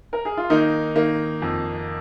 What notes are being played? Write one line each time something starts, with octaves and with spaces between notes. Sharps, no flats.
A#4
G#4
F4
D#3 A#3 D#4
D#3 A#3
F2